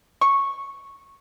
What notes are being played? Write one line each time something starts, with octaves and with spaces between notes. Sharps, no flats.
C#6